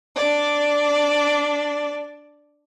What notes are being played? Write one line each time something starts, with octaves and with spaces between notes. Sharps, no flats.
D4 D5